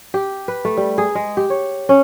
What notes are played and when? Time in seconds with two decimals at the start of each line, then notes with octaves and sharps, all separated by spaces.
0.14 G4
0.48 B4
0.65 A3
0.77 G3
0.98 G#4
1.15 G#3
1.37 G4
1.50 C#5
1.89 C#4